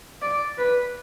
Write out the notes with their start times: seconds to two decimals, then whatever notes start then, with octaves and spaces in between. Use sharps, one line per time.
0.22 D5
0.58 B4